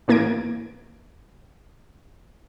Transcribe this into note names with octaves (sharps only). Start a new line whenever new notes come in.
A2 E3 A#3 G#6 A#6 D7